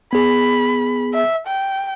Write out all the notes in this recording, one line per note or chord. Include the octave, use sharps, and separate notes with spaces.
B3 G#4 B5
E5
G5